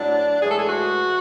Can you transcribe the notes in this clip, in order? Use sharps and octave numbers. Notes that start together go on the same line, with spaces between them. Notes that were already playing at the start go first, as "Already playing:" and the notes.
Already playing: A2 F#3 D4
A2 E3 G#3 G#4
A4
G#4
F#4